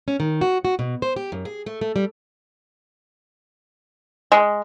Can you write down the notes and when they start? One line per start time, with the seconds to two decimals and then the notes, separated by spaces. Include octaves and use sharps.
0.08 C#4
0.20 D#3
0.41 F#4
0.65 F#4
0.79 B2
1.02 C5
1.16 G4
1.32 F#2
1.45 G#4
1.66 A3
1.81 A3
1.96 G3
4.32 G#3